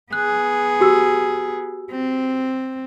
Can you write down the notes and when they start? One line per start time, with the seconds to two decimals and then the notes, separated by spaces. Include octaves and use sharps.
0.13 B3 G#4 F#6
0.81 F#4 G4 E6
1.91 C4